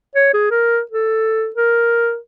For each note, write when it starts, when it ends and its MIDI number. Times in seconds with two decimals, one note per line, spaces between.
0.15 0.31 73
0.34 0.50 68
0.50 0.80 70
0.91 1.50 69
1.56 2.17 70